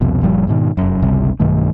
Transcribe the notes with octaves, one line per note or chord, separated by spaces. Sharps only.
C2 F2 B2
F#1 A#2 F3 G3
G#2 B2 D#3
F1 F#2
G1 C#2 C3 G3
B1 G2 D#3 A3